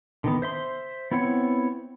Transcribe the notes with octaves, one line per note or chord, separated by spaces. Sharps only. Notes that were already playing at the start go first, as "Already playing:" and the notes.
D3 D#3 B3
C5 E5 C6
B3 C4 E4 C#5 F#5